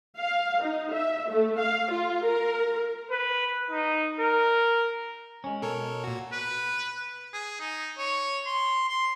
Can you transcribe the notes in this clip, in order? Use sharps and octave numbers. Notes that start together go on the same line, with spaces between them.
F5
D#4
E5
A3
F5
F4
A#4
B4
D#4
A#4
G#3 C#4
B2 A4 A#4 C#5
A#2 F#4
B4
G#4
D#4
C#5
C6
C6